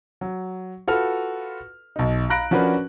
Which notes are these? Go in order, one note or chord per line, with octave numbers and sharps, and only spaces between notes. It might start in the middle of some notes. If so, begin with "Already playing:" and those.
F#3
F4 F#4 A4 B4 F6
B1 D#4
F5 A#5 B5 F#6 A#6 D7
F3 C#4 D4 F#4 A#4 B4